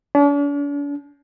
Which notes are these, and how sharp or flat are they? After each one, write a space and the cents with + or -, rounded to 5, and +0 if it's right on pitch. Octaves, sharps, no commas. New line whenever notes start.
D4 -45